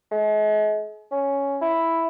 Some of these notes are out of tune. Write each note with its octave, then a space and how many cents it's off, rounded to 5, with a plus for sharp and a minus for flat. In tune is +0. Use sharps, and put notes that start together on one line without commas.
G#3 +40
C#4 +5
E4 +0